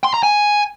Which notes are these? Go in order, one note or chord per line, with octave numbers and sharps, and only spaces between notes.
C6
A#5
G#5